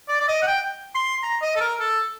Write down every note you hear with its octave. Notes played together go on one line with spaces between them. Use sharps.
D5
D5
D#5
F#5
G5
C6
A#5
D#5
A4
A#4
A4